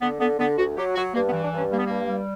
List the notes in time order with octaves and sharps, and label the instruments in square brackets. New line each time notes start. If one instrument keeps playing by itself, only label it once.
[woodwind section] D3 B3
D3 B3
D3 B3
D2 F#4
F#3 G4
F#3 F#4
G2 A#3
B3
E3
D4
G2 C#4
G3 A#3
B3
G2 A#3
G3